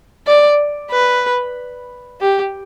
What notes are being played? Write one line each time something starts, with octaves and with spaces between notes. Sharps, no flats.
D5
B4
G4